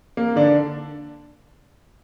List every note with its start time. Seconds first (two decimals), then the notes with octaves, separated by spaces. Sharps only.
0.17 A#3
0.36 D3 D4